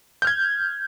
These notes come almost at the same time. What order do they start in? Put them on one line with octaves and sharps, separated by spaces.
G6 F6 G#6